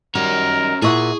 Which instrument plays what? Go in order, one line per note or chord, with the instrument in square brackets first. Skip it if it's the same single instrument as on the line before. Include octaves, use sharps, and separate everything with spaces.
[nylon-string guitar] D#3 G3 [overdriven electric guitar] C#4 F#4 [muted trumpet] A#4
[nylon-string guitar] A#2 E5 F#5 [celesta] E4 C#6 [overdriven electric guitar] G#4